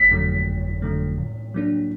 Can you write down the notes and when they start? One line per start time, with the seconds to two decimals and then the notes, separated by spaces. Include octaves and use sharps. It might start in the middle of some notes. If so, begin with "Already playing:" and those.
Already playing: G1 B6
0.10 F2 D3 F#3 A3
0.46 G1
0.82 F2 D3 F#3 A3
1.18 A2
1.54 F#3 A#3 D4